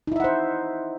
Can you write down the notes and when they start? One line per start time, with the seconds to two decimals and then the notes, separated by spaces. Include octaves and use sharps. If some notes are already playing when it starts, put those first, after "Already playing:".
0.07 D#4
0.12 E4
0.16 E5
0.20 F#5
0.24 C5